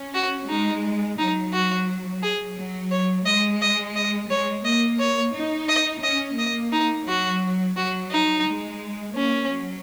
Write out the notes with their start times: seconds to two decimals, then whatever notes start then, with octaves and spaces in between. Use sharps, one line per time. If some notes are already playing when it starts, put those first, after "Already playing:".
Already playing: C#4
0.14 F#4
0.49 G#3 D#4
1.18 F#3 D#4
1.53 F#4
2.23 G#4
2.57 F#3
2.91 C#5
3.26 G#3 D#5
3.62 D#5
3.96 D#5
4.30 G#3 C#5
4.65 A#3 D#5
4.99 C#5
5.35 D#4
5.69 D#5
6.03 C#4 D#5
6.38 A#3 D#5
6.73 D#4
7.07 F#3 F#4
7.77 F#3 F#4
8.11 D#4
8.46 G#3
9.15 A#3 C#4
9.50 F#3